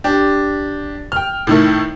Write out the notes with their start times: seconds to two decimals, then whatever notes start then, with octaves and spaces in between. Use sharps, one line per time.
0.04 D4 G4
1.12 G5 F6
1.47 A2 D#3 A3